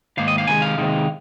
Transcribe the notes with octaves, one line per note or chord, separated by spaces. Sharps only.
G#2 D#3 A#3 F5
D#5
F5
C3 D#3 G#3 G#5
F5
C3 D#3 G#3